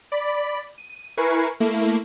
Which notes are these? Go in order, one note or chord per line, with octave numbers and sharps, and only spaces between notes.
D5 B5
D#7
E4 A#4 B4 G#5 C#6 C7
A3 A#3 E4